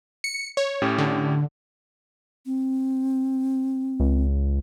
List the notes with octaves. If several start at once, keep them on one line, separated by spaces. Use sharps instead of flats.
C#7
C#5
A2 C#4 G4
D3
C4
C#2